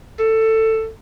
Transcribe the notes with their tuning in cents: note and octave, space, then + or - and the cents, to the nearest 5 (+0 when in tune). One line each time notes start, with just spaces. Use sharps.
A4 +15